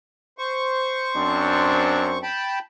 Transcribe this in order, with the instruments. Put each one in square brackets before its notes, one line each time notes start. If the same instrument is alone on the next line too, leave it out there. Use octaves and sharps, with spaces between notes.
[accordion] C5 C#6
[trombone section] F#2 C4 D4
[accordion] G5 A5 B5